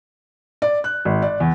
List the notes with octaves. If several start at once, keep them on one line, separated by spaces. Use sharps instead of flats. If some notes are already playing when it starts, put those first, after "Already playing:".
D5
F#6
G#1
D5
E2